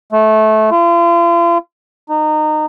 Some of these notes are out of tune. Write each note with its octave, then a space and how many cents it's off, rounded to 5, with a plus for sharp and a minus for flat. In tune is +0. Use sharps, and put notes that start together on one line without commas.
A3 -20
F4 -40
D#4 -25